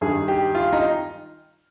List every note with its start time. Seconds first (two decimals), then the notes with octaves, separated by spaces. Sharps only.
0.01 G2 D#3 G3 G#4
0.28 G4
0.55 F4
0.73 D#4